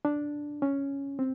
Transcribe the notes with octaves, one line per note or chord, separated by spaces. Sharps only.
D4
C#4
C4